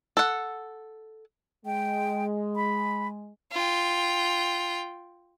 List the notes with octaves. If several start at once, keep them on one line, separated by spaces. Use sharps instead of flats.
A4 F#5
G#3 G5
B5
F4 G5